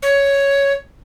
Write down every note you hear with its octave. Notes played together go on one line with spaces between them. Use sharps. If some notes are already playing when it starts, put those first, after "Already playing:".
C#5